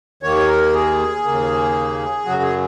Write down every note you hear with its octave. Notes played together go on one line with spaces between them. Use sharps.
D#2 D#3 A#3 C#5
A#4
G#4
D#2 C#3 A#3
F#2 C#3 F#3 F#4
G#4